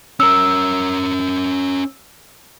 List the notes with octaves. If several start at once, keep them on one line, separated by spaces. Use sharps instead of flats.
C#4 A#4 E6